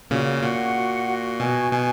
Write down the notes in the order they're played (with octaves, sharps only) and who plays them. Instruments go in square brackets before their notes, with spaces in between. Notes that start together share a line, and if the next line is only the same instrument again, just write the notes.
[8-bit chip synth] A#2 C#3 [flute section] F#4
[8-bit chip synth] A#2 [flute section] F#5
[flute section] F#4
F#4
[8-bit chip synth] B2 [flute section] G#5
[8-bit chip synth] B2 [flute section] G#5